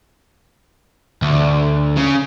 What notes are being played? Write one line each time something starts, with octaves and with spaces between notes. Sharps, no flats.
D2
C#3